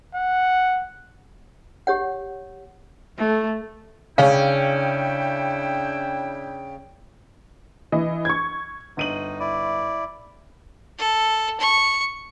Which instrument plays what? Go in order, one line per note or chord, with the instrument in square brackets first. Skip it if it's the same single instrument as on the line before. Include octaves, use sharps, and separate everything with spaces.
[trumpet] F#5
[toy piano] G4 C#5 F#5
[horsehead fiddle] A3
[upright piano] C#3 [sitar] C#4 [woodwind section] D4 E4 G5 [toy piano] F5
[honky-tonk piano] E3 D#5
C#6 G#6
[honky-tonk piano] G1 D#7 F#7 [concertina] D#4
[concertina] E4 D5
[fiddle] A4
C#6